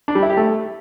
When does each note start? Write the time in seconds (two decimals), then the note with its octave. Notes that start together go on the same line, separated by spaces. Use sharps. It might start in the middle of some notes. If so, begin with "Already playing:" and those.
0.08 D4
0.15 G3
0.23 E4
0.30 G4
0.37 A3